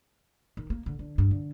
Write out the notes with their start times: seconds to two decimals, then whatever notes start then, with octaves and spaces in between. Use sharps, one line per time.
0.57 D#3
0.70 A#3
0.86 D3
0.99 D3
1.18 G2
1.31 D3